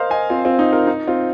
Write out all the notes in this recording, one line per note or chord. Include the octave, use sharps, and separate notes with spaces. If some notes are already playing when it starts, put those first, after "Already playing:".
Already playing: A#4 C5 D#5 F5
D#5 G#5
C4 F4
C4 F4
D#4
F4 A#4
D#4
C4 F4